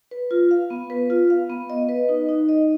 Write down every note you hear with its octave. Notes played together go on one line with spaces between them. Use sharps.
B4
F4
F5
B3
B4
F4
F5
B3
D#5
B4
D#4
D#4
D#5